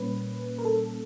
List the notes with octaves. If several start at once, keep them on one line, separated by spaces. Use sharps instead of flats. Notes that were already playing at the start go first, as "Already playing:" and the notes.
Already playing: A#2 G3 A#3 C#4 B4
A#4
A4